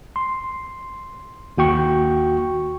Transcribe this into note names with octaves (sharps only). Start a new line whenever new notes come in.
C6
D#2 F#4 G5 C#6